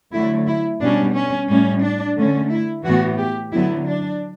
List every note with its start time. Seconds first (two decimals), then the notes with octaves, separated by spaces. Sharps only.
0.12 D3 F#3 A3 E4
0.47 E4
0.80 B2 G3 C#4 D4
1.14 C#4
1.48 A2 G3 C#4
1.82 D4
2.16 D3 A3 C#4
2.50 E4
2.84 A2 E3 B3 F#4
3.18 G4
3.52 D3 F#3 B3 E4
3.87 D4